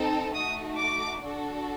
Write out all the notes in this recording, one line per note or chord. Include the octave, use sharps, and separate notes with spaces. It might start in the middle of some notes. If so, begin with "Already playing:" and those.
Already playing: C4 D#4 A4
A3 D#4 F#4 D#6
D6
D4 F#4 A4